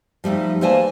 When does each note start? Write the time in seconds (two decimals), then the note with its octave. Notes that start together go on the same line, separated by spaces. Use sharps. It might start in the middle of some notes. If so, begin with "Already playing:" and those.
0.24 F3 G3 A3 D#4
0.61 E3 A#3 C5 D5 G#5 A5